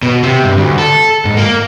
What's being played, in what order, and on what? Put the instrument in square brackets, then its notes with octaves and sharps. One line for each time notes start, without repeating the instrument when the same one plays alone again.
[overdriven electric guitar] B2
C3
G2
D2
A4
G#2
A#3